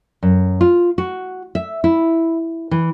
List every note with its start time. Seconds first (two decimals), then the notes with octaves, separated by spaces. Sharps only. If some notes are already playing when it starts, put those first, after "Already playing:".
0.23 F#2
0.61 F4
0.98 F#4
1.55 E5
1.84 E4
2.71 E3